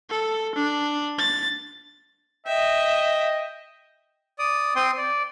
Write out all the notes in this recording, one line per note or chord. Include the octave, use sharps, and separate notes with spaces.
A4
D4
A6
D#5 E5 G5
D5 D#6
C4 G5 C6 D#6
D5